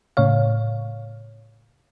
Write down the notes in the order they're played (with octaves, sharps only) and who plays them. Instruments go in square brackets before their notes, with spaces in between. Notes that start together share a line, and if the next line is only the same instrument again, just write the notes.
[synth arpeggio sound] A2 C#3 C#5 F5